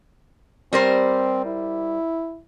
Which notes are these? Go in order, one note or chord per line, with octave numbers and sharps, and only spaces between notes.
G3 C4 A#4 C5
E4